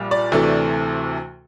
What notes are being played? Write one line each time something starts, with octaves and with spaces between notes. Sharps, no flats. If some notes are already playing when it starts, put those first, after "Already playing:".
Already playing: A#1 A#2 G3
D5
D2 C3 E3 A3